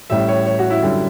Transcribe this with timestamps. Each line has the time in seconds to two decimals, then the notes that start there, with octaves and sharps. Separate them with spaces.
0.10 A1 A2 G3 E5
0.28 C#5
0.46 C#5
0.59 F#4
0.70 E4
0.82 F#2 D3 G3